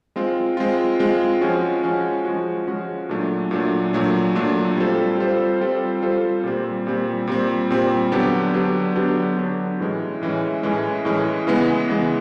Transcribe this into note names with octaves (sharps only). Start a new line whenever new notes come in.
G#3 C4 F4
G#3 C4 F4
G#3 C4 F4
F3 G#3 C#4 F#4
F3 G#3 C#4 F#4
F3 G#3 C#4 F#4
F3 G#3 C#4 F#4
A#2 F#3 A3 D4
A#2 F#3 A3 D4
A#2 F#3 A3 D4
A#2 F#3 A3 D4
G3 C4 F4 A4 C5
G3 C4 F4 A4 C5
G3 C4 F4 A4 C5
G3 C4 F4 A4 C5
A#2 G3 C4
A#2 G3 C4
A#2 G3 C4
A#2 G3 C4
D3 F#3 B3 D4 G4
D3 F#3 B3 D4 G4
D3 F#3 B3 D4 G4
D3 F#3 B3 D4 G4
A2 E3 G#3 C#4
A2 E3 G#3 C#4
A2 E3 G#3 C#4
A2 E3 G#3 C#4
C#3 E3 G#3 B3
C#3 E3 G#3 B3